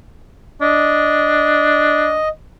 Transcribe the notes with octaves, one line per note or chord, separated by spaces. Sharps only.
D4 D#5